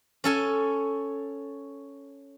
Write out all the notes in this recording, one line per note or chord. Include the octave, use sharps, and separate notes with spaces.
C#4 A4 G#5